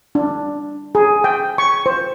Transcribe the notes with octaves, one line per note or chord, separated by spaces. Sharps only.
D4
G#4
G5
C#6
C5